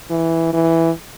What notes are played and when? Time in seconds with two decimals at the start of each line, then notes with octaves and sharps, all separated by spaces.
0.10 E3
0.53 E3